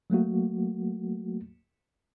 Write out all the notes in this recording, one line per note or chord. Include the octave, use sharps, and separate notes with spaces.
F#3 A3 A#3 F#4